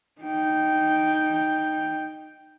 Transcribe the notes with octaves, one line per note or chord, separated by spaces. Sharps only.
D#4 G5